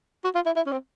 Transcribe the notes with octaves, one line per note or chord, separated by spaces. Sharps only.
F#4
F4
E4
E4
C#4
C4